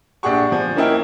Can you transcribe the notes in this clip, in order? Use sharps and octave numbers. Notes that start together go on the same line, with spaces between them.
A#1 D4 G4 G#4 F#5 C#6
F3
A#3 C#4 D#4 E4 A#4 G5